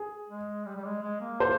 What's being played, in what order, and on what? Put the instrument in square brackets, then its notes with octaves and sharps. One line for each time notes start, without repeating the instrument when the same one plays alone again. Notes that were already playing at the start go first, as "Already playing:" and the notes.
Already playing: [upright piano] G#4
[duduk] G#3
G3
G3
G#3
G#3
A#3
[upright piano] C5